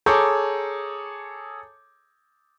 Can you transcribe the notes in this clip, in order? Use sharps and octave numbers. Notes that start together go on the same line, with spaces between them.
G#4 A4 C#5 A#5 D6 G6